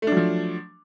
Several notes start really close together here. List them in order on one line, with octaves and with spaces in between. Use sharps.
A3 D4 F#3 F3